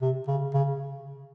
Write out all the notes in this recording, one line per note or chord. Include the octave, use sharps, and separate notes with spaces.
C3
C#3
C#3